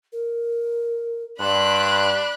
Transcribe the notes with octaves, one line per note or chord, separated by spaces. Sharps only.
A#4
G2 D4 B5 C6 F#6